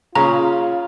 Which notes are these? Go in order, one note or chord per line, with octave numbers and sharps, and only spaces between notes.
A#2 C#3 C#4 F4 A#5